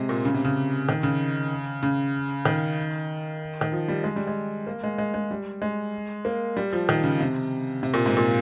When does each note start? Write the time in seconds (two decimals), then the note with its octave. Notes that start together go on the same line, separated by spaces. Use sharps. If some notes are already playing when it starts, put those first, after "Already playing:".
Already playing: C3 G#3
0.09 A#2
0.25 C#3
0.34 C3
0.45 C#3
0.89 D#3
1.03 C#3
1.83 C#3
2.45 D#3
3.61 D#3
3.72 F3
3.88 G3
4.04 G#3
4.16 G3
4.27 G#3
4.67 A#3
4.83 G#3
4.98 G#3
5.14 G#3
5.31 G3
5.62 G#3
6.25 A#3
6.57 G3
6.73 F3
6.89 D#3
7.03 C#3
7.20 C3
7.83 C3
7.94 A#2
8.06 G#2
8.17 A#2